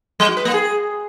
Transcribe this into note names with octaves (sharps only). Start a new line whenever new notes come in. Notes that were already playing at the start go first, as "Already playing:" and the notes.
G3
F#4
B4
A#3
G#4